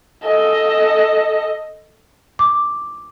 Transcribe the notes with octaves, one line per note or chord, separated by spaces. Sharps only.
A4 D#5
D6